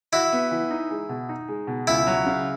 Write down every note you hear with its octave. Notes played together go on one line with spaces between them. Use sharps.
E4 F#4
B3
E3
D#4
G#3
B2
D#4
G#3
B2
C#2 E4
F#3
C#3